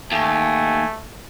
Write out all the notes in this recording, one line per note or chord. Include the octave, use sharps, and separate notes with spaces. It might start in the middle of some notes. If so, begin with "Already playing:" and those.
D#2 A3 G#5